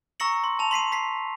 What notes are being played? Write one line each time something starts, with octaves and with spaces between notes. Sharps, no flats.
A#5 C#6 E6 A#6 C#7 F#7
C6
A5 F7
C6 B6 C7 D#7
C6 B6 C7